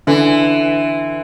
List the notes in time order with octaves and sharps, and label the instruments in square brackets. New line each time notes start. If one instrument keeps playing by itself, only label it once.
[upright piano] D3 [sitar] E3